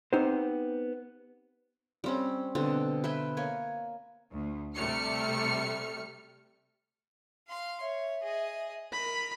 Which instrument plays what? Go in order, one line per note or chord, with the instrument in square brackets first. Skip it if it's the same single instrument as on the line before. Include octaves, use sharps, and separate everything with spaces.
[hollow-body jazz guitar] B3 C4 D#4 G4 C5
[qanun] G3 C4 C#4
B2 D3 C4
B4 E5 G5 G#5
A#3 C#5 G#5
[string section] D2
C3 G3 A3 F6 C#7
[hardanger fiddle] F5 C6
[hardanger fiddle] C#5 [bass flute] E5
[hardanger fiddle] G#4 D#5
[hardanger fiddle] A#4 D#5 [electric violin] B5